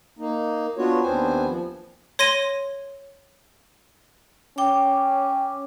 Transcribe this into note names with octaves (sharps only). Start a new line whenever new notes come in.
A#3 D#4
B3 D4 F4 F#4 C#5
D#2 B3 C4 D4 C5 G#5
F3
C#5 C6 A#6 D#7
C#4 G5 D6